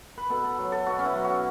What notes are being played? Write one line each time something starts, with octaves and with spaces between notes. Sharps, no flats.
B4
B2 A4
A4
F#3
A4
B2 F#4
C#4
E4
F#3
F#4